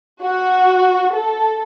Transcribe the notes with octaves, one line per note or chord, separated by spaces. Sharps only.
F#4
A4